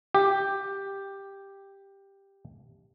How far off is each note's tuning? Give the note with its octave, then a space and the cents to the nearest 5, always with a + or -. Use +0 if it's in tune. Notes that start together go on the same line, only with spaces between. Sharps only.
G4 +5